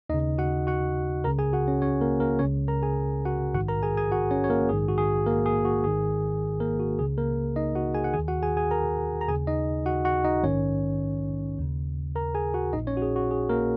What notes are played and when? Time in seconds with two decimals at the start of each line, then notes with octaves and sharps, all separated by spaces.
0.09 D#2 D#4 D#5
0.14 C#3
0.38 F#4 F#5
0.67 F#4 F#5
1.24 C#2 A#4 A#5
1.28 C#3
1.39 G#4 G#5
1.53 F#4 F#5
1.68 C#4 C#5
1.82 C#4 C#5
2.01 A#3 A#4
2.20 A#3 A#4
2.39 C#2 C#3 C#4 C#5
2.68 A#4 A#5
2.82 G#4 G#5
3.25 F#4 F#5
3.54 A#1 G#2 D#3 F#4 F#5
3.68 A#4 A#5
3.83 G#4 G#5
3.97 G#4 G#5
4.12 F#4 F#5
4.31 C#4 C#5
4.44 C#5
4.50 A#3 A#4
4.69 A#1 G#2 D#3 G#4
4.88 F#4
4.98 G#4
5.26 A#3 A#4
5.46 G#4
5.65 F#4
5.83 G#1 G#2 D#3 G#4
6.60 A#3 A#4
6.80 F#4
6.99 C#2 C#3 G#4
7.18 A#3 A#4
7.56 D#4 D#5
7.75 F#4 F#5
7.95 G#4 G#5
8.04 F#5
8.13 D#2 D#3 G#4 G#5
8.28 F#4 F#5
8.43 G#4 G#5
8.57 G#4 G#5
8.71 A#4 A#5
9.21 A#5
9.28 D#2 C#3 G#4 G#5
9.47 D#4 D#5
9.86 F#4 F#5
10.05 F#4 F#5
10.24 D#4 D#5
10.43 A#1 G#2 D#3 C#4 C#5
11.58 D#2 C#3
12.16 A#4 A#5
12.35 G#4 G#5
12.54 F#4 F#5
12.73 A#1 A#2 D#4 D#5
12.87 C#4 C#5
12.97 F#4
13.02 G#4
13.16 F#4
13.31 G#4
13.50 A#3 A#4